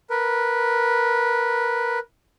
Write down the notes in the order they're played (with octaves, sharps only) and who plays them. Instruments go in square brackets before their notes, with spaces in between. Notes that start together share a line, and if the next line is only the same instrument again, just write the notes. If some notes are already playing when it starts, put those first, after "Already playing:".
[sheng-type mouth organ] A#4 B4